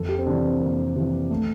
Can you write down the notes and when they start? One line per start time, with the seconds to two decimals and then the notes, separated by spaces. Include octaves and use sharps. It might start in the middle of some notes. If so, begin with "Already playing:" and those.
Already playing: F2 A4
0.09 G4
0.18 C4
0.26 C3 E3 D4
0.44 C4
0.61 F2 A#3
0.96 C3 E3
1.30 A3